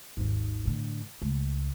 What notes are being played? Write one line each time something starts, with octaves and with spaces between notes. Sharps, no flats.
G#1 D#2
A2 D3
C#2 A3